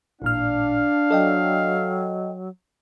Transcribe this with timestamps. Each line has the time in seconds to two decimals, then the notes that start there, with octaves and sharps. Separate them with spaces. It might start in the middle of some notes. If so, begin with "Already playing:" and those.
0.22 A1 A#2 D4 F5 F6
1.11 F#3 A4 D#5 G5